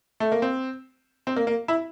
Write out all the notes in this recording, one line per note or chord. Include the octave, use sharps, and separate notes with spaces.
A3
A#3
C4
C4
A#3
A#3
E4